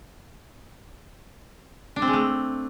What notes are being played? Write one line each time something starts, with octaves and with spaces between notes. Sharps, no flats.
D4
C4
G#3
A3